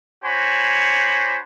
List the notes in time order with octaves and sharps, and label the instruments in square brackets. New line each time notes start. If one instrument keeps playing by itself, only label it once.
[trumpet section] D4 F#4 C5 C#5 G#5 B5